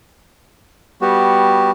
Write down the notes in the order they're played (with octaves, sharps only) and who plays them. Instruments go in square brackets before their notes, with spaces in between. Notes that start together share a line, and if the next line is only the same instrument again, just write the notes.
[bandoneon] G3 B3 F#4 G4